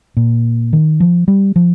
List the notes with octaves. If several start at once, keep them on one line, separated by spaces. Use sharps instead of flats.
A#2
D#3
F3
G3
F3